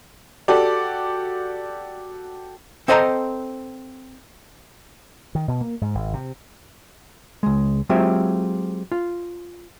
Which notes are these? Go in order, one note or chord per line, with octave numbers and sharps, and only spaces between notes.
F#4 G4 A4 D5
C4 A4 C5 D#5 G5 A#5
D#3
B2
A#3
G#2
G#1
C3
C#2 G#3
F#3 G#3 C4 F4 G4 E5
F4